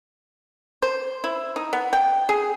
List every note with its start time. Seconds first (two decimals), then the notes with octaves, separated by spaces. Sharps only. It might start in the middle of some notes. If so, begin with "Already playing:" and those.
0.82 C5
1.24 E4
1.56 D#4
1.73 B3
1.93 G5
2.29 G#4